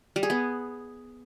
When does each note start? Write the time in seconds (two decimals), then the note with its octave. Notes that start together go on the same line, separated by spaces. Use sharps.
0.16 G3
0.23 G#4
0.30 B3